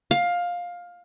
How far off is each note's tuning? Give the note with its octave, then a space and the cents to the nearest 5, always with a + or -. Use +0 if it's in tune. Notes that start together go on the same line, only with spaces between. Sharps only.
F5 +15